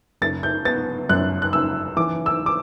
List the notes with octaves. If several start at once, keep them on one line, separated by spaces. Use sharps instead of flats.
F#1 A6
G6
B3 A6
F#2 F#6
F#6
F#1 E6
E3 D6
E6
D6